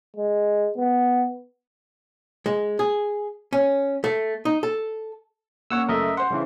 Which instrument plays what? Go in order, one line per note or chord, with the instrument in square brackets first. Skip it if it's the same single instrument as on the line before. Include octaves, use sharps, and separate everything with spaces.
[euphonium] G#3
B3
[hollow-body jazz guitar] G#3
G#4
C#4
A3
D#4
A4
[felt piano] A#3 C#4 [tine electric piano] C#5 F#5 E6
[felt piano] F#1 A3 [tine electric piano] A#4 D#5 E5
[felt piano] C5 C6 [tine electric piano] F#5
[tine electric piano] G2 C#3 E3